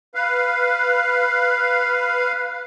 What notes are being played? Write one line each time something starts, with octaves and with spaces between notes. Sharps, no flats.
B4 F5